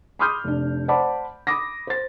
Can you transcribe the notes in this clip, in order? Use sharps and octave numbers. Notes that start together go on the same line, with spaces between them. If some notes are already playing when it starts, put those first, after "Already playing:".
B5 C6 D6 D#6 F6 G6
F1 D4
C5 D5 F#5 A5 B5 D6
B5 D6 D#6 A#6
C5 A6